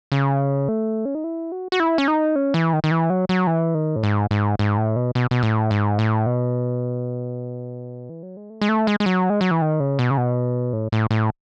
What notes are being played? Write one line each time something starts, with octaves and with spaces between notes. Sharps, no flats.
C#3
A3
C#4
D#4
E4
F#4
F#4
E4
C#4
D#4
C#4
E3
D#3
D#3
E3
F#3
F#3
E3
D#3
A2
G#2
G#2
G#2
A2
B2
B2
B2
A2
G#2
A2
B2
E3
F#3
G#3
A3
G#3
A3
G#3
G#3
F#3
G#3
F#3
E3
D#3
C#3
B2
C#3
B2
A2
A2
A2